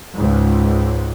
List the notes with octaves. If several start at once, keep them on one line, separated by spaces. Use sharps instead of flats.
C#2 G#2